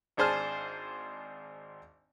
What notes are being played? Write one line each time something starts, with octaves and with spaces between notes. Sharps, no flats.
G#1 D4 G#4 C5 A5 F6